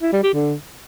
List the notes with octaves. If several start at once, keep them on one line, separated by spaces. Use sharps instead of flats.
E4
G3
G4
D3